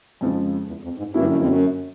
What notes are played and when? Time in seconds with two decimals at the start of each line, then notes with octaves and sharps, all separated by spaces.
0.21 F2 C#3 F3 G#3
0.68 E2
0.84 F2
0.98 G#2
1.14 G2 D3 F#3 A#3 C#4 E4
1.25 F#2
1.36 F2
1.47 F#2